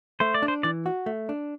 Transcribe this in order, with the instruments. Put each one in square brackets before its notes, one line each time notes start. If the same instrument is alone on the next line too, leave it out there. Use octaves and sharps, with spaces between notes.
[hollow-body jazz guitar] A3 [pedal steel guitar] C5
[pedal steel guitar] D5
[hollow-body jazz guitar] D4
[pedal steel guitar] C5
[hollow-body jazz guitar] E3 [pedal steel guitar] D5
[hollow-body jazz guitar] F#4
A3
D4